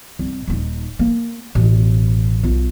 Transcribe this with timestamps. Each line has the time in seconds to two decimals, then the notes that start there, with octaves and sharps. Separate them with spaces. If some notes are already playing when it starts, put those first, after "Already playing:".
0.19 C2
0.47 D#1 D#4
0.99 A#3
1.55 A1 B2
2.43 B1 F4